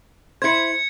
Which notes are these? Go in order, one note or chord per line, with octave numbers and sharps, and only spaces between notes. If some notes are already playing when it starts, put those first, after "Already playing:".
E4 C5 G#6 C#7